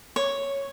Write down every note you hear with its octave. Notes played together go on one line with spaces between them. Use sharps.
C#5